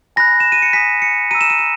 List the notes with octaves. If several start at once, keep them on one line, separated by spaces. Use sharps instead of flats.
G#5 B5 F#6 A#6
E7
D#7
C#7
G#5 D#6 F#6 B6
C#7
A#5 E6 D#7
E7
D#7
E7